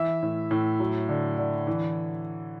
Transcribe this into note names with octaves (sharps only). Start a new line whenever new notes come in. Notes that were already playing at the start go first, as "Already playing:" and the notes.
Already playing: E3 E5
A2
A2
F#3
D3
D3
E3